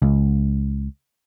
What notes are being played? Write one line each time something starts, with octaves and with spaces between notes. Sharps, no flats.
C#2